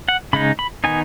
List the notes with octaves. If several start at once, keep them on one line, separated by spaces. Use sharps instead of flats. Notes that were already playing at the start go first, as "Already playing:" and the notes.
F#5
C#3 G#3 D#4 B5
B5
D#3 B3 D#4 G#5